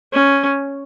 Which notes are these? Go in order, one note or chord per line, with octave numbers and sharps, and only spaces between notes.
C#4